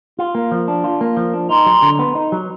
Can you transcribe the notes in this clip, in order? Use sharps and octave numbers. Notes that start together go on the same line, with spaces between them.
F4
A#3
F3
D4
F4
A#3
F3
D4
D#4 A#5 C6
F#3
D3
B3
D#4
F#3